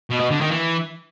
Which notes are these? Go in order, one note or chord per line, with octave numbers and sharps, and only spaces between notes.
B2
B2
D3
D#3
E3